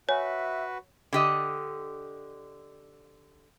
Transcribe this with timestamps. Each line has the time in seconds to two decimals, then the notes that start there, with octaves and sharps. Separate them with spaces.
0.09 F#4 B4 C#5 E5 G#5
1.13 D3 G4 D#5